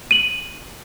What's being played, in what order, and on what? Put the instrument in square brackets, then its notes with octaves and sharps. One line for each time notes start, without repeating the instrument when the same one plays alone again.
[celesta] D#7 F#7